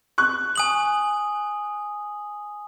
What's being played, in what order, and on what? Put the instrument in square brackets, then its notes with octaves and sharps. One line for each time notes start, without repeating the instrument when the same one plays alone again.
[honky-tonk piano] C#6 F#6
[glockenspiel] G#5 D#6 F#7